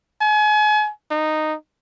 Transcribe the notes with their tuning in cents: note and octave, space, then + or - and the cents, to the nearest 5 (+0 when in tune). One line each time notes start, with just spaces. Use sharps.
G#5 +35
D#4 -10